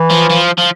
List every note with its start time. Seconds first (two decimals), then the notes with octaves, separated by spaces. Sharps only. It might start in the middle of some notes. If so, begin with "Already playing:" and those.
Already playing: E3
0.11 F3
0.30 F3
0.58 F3